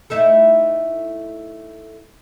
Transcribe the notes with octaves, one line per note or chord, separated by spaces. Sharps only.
A3 D#4 E4